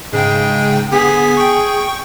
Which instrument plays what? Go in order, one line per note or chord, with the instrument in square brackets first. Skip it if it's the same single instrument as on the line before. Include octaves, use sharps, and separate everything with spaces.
[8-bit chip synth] G#2 C#3 G5 [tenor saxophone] G#3
[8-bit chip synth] D3 B3 B6 [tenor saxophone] G#4
[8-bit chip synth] G5 C#6